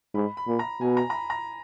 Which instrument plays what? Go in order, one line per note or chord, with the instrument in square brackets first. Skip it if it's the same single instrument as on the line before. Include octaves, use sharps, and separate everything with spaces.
[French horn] G#2 [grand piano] B5
[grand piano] B5
[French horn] A#2
[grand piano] A#5
[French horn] B2 [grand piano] G#5
[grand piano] A#5
A#5
B5
A#5